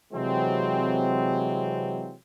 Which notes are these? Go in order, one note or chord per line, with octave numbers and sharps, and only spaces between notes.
C3 E3 F#3 G#3 C4